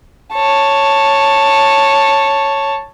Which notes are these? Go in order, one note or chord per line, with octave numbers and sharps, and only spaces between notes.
C#5 A5